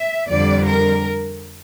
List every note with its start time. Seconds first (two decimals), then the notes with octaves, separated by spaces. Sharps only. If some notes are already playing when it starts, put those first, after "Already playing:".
Already playing: E5
0.30 F2 D3 G3 D5
0.67 A#4